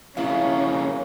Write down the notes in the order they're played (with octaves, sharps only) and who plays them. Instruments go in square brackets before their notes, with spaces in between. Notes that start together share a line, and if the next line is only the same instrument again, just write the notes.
[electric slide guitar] F2 C#3 A#3 [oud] B3 E4 [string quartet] C#4 [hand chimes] F5